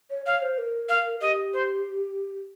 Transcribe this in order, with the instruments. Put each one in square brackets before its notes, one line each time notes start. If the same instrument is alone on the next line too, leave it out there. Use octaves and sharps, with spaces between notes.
[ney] C#5
[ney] C#5 [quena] F5
[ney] C5
A#4
[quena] F5
[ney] G4 [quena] D#5
[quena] C5